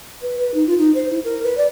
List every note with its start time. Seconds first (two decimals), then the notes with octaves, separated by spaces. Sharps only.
0.22 B4
0.39 B4
0.54 D#4
0.67 F4
0.79 D#4
0.95 C5
1.10 E4
1.24 A#4
1.43 B4
1.58 D5